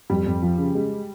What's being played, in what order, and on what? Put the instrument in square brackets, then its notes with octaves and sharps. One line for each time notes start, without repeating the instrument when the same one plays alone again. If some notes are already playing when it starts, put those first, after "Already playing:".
[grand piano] F2 [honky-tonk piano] G3
[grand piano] F2
F3
C#3
G#3